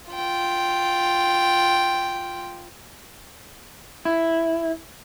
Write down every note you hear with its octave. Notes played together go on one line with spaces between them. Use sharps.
F4 G5
E4